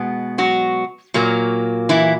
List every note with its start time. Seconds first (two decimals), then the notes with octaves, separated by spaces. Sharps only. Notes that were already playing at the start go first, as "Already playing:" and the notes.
Already playing: B2 G#3 B3
0.38 F#3 F#4
1.14 A#2 F#3 A#3
1.89 E3 E4